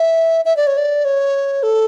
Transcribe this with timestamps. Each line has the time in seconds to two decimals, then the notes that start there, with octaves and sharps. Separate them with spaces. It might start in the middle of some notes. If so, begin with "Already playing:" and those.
Already playing: E5
0.45 E5
0.57 D5
0.67 C#5
0.77 D5
1.05 C#5
1.63 A4